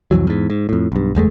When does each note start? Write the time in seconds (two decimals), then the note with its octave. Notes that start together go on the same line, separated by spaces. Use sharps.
0.11 C2 F2 E3 F#3
0.27 E2 G#2
0.50 G#2
0.69 F2 A2
0.92 B1 G2
1.15 F#1 E2 G#3 A3